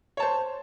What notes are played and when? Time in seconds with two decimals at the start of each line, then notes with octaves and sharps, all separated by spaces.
0.17 C#5
0.20 A5
0.23 C5